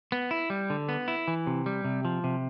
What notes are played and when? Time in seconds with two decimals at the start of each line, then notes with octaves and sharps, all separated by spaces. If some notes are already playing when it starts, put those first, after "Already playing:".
0.12 B3
0.31 E4
0.50 G3
0.70 D3
0.89 B3
1.08 E4
1.28 E3
1.47 C3
1.66 G3
1.85 C3
2.05 F3
2.24 C3